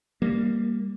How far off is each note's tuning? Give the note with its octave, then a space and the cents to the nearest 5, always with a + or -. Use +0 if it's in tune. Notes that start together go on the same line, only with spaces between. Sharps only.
G3 +20 A#3 +0